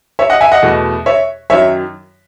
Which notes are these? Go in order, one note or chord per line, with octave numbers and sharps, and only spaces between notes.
C#5 E5
D#5 F#5
E5 G#5
D#5 F#5
E2 B2 A3
C#5 E5
F#2 D#3 F#3 C#5 E5